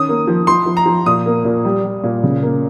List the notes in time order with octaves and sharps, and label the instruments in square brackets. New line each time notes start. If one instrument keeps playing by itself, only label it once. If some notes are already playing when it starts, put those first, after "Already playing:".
Already playing: [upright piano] D#3 C#4 [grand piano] D#6
[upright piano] A#3
F3
[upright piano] F3 [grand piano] C6
[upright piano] F3
[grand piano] A#5
[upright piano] F3
[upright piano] A#2 [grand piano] D#6
[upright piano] A#3
A#2
G3
G3
A#2
C#3
A#3